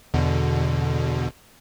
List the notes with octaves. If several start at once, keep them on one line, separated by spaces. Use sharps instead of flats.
E2 B2 D3